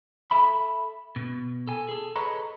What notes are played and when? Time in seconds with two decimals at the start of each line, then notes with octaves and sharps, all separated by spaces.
0.31 A4 E5 B5
1.16 B2
1.67 A4 G#5
1.89 G#4 A4
2.16 G#4 A4 B4 C#5 D#5 A#5